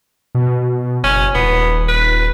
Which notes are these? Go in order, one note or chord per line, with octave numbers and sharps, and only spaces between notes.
B2
F#1 C#4
D#1 B3
B4